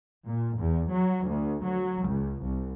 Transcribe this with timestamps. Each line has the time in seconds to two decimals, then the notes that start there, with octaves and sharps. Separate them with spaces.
0.26 A#2
0.57 E2
0.89 F#3
1.27 D2
1.63 F#3
2.06 C#2
2.41 C2